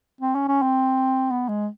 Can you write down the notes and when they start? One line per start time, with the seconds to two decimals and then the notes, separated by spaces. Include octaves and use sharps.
0.21 C4
0.35 C#4
0.48 C#4
0.62 C4
1.31 B3
1.49 G#3